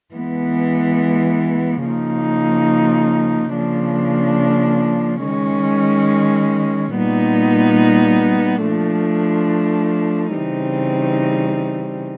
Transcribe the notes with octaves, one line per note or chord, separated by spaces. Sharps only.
E3 G#3 B3
C#3 F3 A#3 D#4
C#3 F3 A#3 D4
D#3 G#3 C#4
A#2 G3 B3 D#4
F3 A3 D4
C#3 E3 G3 C4 D#4